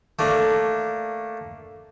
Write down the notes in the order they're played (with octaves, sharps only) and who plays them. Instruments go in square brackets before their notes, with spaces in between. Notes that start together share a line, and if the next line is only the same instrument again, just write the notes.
[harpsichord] A3 A#3 D4